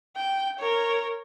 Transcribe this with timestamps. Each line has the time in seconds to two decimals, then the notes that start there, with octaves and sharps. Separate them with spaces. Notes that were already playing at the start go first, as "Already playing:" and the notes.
0.16 G5
0.59 A#4 C#5